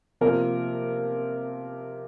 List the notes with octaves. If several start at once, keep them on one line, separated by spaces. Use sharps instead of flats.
C3 F3 A#3 F4 A#4